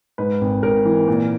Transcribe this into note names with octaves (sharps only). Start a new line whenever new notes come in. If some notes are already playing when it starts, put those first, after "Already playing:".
G#2 B4
G#1
G#1 A#4
E3
A#2